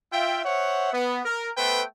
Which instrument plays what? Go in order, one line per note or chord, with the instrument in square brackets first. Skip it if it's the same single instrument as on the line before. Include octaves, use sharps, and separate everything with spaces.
[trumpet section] F4 E5 G5
C5 C#5 E5 F#5
B3
A#4
A3 B3 A4 B4 C5 G5